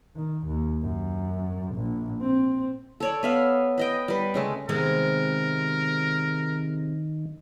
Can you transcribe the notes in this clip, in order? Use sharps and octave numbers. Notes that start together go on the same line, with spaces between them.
D#3
D#2
F#2
A#1
C4
A4 C#5 D5
B3 E5 F5
B4 D#5 G5
G3 B4
C#3 G#3 A3
C3 D#3 G#3 B3 A#4